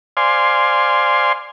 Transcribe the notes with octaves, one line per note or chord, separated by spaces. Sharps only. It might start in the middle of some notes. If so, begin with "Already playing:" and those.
C5 D5 F5 G#5 C6